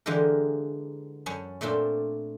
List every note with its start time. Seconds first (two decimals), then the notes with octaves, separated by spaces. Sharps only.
0.06 D3 E3 G#3 F4 G4 A#4
1.26 F#2 C#4 A5
1.61 A#2 A3 C4 D4 F4